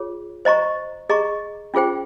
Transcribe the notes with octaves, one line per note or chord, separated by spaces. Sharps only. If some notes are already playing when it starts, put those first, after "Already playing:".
Already playing: F4 G#4 C#5
C5 D#5 A#5 C#6
G#4 D#5 A#5 C#6
C#4 F4 G#4 C5 G5